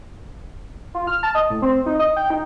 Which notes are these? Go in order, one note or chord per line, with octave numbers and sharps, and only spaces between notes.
F4
F6
A5
D#5
A2
C4
D#4
D#5
G5
D#4